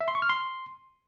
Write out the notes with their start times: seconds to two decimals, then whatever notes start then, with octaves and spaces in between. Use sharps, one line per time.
0.01 E5
0.08 C6
0.15 C#6
0.22 F6
0.29 C6